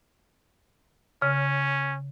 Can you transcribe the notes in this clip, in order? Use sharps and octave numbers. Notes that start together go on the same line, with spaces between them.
C#3 C#4